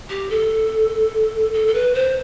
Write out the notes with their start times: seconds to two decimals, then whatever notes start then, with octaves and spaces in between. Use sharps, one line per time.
0.10 G4
0.30 A4
1.54 A4
1.68 A4
1.75 B4
1.95 C5